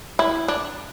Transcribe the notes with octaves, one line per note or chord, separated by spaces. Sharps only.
E4
D4